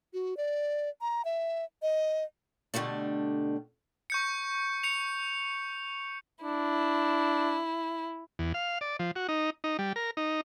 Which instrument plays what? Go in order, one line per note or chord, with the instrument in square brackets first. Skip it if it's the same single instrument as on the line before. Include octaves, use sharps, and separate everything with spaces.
[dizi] F#4
D5
A#5
E5
D#5
[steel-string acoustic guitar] B2 D3 G3 A3 D4
[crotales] C#6 G6 C#7
C#7 F7
[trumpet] D4 [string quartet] E4
[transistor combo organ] E2
F5
D5
F3
F#4
D#4
D#4
G3
A#4
D#4